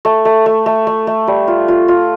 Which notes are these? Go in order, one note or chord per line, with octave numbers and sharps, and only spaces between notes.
A3
A3
A3
A3
A3
A3
G3
F4
F4
F4